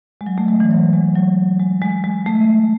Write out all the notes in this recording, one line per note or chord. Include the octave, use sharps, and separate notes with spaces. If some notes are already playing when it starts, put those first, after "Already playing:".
G#3
F#3
A3
G#3
E3
F#3
G#3
F#3
G#3
G#3
G#3
A3